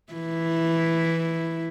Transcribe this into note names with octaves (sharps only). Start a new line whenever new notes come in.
E3 E4